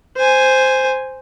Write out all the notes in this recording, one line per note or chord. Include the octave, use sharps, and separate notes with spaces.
C5 G#5